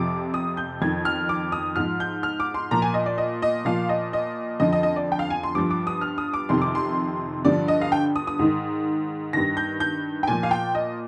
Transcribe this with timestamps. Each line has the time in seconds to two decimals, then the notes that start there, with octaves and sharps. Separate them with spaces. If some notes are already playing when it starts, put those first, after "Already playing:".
Already playing: F2 C3 F3 D6
0.34 D#6
0.57 G6
0.82 F2 D#3 G#6
1.05 F6
1.29 D6
1.52 D#6
1.76 G#2 F3 F6
2.00 G6
2.23 F6
2.40 D6
2.54 C6
2.71 A#2 F3 A#5
2.82 G#5
2.94 D#5
3.06 D5
3.18 D#5
3.42 D#5
3.65 A#2 F3 F5
3.89 D#5
4.13 D#5
4.60 F2 D3 F3 D#5
4.72 D#5
4.83 D#5
4.96 D5
5.12 G5
5.19 F5
5.30 G#5
5.43 C6
5.55 G2 F3 D6
5.71 D6
5.87 D#6
6.01 F6
6.18 D#6
6.34 D6
6.49 F2 C3 D#3 C6
6.61 D6
6.75 C6
7.45 G2 D3 F3 D5
7.68 D#5
7.82 F5
7.92 G5
8.16 D#6
8.27 D#6
8.39 G#2 D#3
9.33 G2 D#3 A#6
9.57 G6
9.80 G6
10.23 G5
10.27 A#2 F3 G#5
10.43 F5
10.51 G5
10.75 D#5